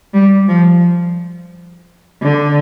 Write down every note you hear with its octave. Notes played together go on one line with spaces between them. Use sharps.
G3
F3
D3